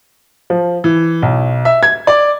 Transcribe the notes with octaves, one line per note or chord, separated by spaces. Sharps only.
F3
E3
B1
E5
G#6
D5